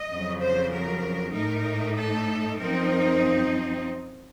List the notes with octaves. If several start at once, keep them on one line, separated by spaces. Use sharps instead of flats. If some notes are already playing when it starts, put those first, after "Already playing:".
Already playing: D#5
F2 C#3 F#3
C5
A#4
A2 A3 D#4 A#4
A4
F#2 F3 C4 D#4 A#4